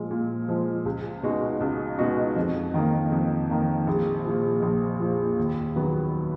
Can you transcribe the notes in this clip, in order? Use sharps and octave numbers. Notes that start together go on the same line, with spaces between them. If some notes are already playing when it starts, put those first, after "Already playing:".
Already playing: A#2 F3 G#3
A#2
F3 G#3
C#2
B2 G#3 D#4 F#4
C#2
B2 G#3 D#4 F#4
F2
D#3 A#3
F2
D#3 A#3
A#1
A#2 F3
A#1
A#2 F3
D#2
D#3 F#3 B3